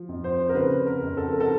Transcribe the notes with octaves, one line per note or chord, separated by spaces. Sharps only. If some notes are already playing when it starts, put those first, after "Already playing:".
Already playing: F3
F2
C5
A#4
C#3 B4
A#4
F2
A4
A#4
A4